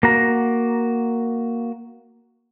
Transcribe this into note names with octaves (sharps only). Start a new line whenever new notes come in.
A#3 F#4 A#5